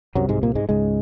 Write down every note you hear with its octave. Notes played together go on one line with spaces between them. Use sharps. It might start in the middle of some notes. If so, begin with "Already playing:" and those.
C2 F#2 C3 F#3
G#2 G#3
A#2 A#3
G#2 G#3
C#2 G#2 C#3 G#3